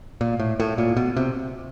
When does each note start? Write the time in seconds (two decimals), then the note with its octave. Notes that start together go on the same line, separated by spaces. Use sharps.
0.21 A#2
0.40 A2
0.60 A2
0.78 A#2
0.97 B2
1.17 C3